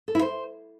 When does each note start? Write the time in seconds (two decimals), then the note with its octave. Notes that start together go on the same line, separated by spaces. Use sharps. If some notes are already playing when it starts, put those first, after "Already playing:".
0.08 A4
0.15 E4
0.22 C5